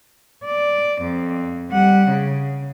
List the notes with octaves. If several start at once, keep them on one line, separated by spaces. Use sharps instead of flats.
D5
F2
G3 F#5
C#3